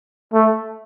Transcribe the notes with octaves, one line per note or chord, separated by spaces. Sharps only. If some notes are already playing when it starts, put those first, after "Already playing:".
A3